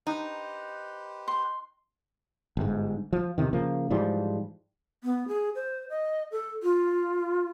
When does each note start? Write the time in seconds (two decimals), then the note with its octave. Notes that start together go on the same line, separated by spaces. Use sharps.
0.07 D#4 G4 B4 C5
1.28 C6
2.57 G1 G#2
3.13 F3
3.38 E2 C3 D#3
3.53 C#3 F3 A#3
3.90 G#2 E3 F3 G3
5.03 B3
5.28 G#4
5.55 C5
5.90 D#5
6.32 A4
6.63 F4